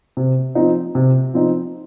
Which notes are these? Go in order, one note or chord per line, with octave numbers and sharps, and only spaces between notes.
C3
F3 C4 D#4
C3
F3 C4 D#4